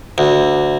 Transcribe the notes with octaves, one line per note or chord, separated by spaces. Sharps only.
D2